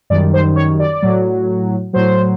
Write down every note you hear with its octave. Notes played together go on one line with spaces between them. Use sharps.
F#2 D#3 G3 D5
C5
C#5
D5
A2 F#3
A2 F#3 C5